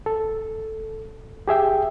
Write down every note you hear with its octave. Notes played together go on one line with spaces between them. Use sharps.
A4
G4 G#4 E5 G5